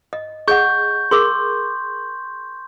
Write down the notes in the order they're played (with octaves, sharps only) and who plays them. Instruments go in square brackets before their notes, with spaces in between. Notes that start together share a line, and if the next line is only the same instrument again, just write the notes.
[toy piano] D#5
[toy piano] G#4 D#5 F#5 [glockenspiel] C#6 G6
[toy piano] G#4 A#4 D6 [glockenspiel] C6